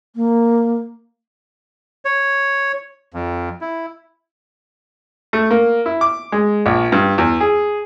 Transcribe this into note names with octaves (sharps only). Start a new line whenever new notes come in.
A#3
C#5
F2
E4
A3
A#3
E4
D6
G#3
A#1
G2
E2
G#4